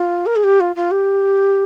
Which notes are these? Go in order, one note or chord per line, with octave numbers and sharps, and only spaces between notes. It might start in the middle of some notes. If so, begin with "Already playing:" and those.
Already playing: F4
A#4
G#4
G4
F4
F4
G4